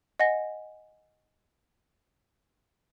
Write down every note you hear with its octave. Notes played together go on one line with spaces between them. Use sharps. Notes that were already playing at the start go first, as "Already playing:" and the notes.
D#5 F#5 G#5 A#6